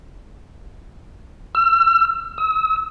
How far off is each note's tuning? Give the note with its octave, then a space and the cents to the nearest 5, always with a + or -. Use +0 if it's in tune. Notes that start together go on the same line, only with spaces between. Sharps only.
E6 +40
E6 -40